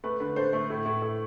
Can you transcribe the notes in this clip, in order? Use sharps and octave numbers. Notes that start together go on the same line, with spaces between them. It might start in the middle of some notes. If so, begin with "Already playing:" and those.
A3 B4
D3 B4
D3 A4 C5
A3
A2
A2
A2